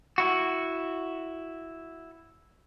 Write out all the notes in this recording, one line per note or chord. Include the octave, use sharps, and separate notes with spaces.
E4 F#4